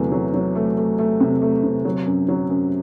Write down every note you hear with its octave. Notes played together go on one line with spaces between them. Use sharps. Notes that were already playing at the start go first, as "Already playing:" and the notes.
Already playing: E2 C3 F#3 A3
F#3
F#3
A3
A3
A3
C3
A3
C3
F#3
F#2
F#3
F#2